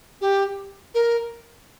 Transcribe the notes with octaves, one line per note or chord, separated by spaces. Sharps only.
G4
A#4